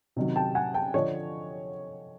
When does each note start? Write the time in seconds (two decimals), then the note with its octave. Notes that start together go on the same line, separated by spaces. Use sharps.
0.16 C3 D#3 F#3
0.36 G5 A5
0.55 F#5 G#5
0.74 G5 A5
0.94 D3 F3 C#5 D#5